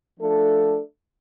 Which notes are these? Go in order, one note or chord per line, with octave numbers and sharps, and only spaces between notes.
F3 A3 D4 A4